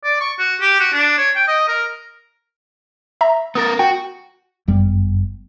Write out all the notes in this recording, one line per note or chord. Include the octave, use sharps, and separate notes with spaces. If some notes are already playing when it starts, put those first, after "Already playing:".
D5
C#6
F#4
G4
F#4
D4
C#5
G5
D#5
A#4
E5 A#5
B3 A#4 D#6 A6
F#4 G5
G1 F#2 G3 B3